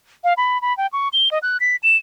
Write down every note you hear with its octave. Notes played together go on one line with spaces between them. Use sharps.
F5
B5
B5
G5
C#6
G7
D#5
F#6
B6
E7